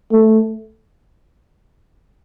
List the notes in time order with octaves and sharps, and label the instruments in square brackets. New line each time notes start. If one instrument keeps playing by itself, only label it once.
[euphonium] A3